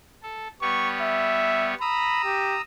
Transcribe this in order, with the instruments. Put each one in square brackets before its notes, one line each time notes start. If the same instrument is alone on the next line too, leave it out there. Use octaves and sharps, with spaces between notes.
[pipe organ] A4
[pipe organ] G3 B3 C#5 [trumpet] C#6
[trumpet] E5
[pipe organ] A#5 D#6 E6 [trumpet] B5
[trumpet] G4